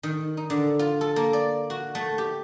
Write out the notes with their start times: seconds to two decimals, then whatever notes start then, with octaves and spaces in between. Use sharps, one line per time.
0.03 D#3
0.37 D#4
0.50 D3
0.79 F4
1.01 A4
1.16 A#3
1.33 D5
1.70 F#4
1.95 A3
2.18 G4